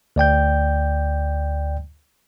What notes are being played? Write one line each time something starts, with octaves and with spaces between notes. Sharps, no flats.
D2 D5 G5 G6